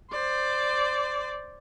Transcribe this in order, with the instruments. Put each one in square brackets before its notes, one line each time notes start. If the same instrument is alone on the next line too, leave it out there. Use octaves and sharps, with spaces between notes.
[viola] C5 D5